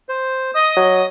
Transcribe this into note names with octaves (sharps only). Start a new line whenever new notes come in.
C5
D#5 D#6
F#3